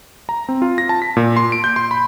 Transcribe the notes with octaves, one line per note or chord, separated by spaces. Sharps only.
A#5
C4
F4
A#6
A5
B6
A#2
C6
D7
G6
C6
B5